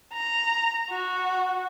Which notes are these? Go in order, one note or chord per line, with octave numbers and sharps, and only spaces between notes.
A#5
F#4